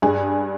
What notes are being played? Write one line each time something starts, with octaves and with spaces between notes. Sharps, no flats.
G2 G#4